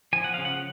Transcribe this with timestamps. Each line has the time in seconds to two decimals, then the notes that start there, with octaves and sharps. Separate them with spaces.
0.13 F3 G#5
0.24 F#5
0.34 C#3 F5
0.45 F#5